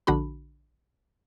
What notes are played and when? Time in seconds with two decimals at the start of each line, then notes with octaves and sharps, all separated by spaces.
0.07 A#1 D3 D4 F#4 B5